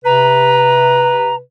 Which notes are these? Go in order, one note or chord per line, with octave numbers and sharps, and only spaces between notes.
C3 B4 A#5